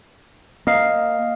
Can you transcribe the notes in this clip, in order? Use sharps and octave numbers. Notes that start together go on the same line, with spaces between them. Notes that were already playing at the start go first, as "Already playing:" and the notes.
A#3 D#5 F5 C7